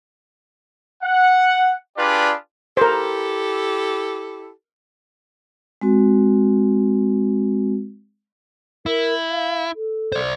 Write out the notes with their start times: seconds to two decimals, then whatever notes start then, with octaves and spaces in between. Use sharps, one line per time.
1.03 F#5
1.97 D4 F4 G4 G#4 B4 D5
2.77 E4 G4 A4 A#4 C5
5.81 G#3 C4 F#4
8.86 E4 A#4
9.30 F5
9.75 A4
10.12 C5 D5